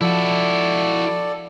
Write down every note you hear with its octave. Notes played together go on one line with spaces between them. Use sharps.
F3 E4 F#4 A4 D5